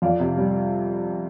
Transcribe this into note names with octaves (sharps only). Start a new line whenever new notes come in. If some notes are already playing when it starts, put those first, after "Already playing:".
F2 D5 F5
C3
G3